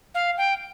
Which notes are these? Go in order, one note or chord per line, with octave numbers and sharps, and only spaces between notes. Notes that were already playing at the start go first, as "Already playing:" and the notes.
F5
G5